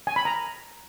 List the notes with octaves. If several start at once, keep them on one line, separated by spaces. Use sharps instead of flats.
G#5
B5
A#5